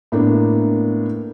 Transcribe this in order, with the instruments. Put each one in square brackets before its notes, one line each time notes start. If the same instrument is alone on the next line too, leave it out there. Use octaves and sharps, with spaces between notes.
[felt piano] A2 A#3 B3 D4